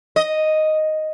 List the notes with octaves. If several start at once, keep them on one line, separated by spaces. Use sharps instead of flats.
D#5